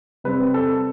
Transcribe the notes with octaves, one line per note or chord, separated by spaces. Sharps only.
C3 G3 C4 B4
A4